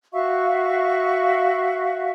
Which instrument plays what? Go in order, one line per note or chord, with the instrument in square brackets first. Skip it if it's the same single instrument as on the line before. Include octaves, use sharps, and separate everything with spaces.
[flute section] F#4 E5 F5 C#6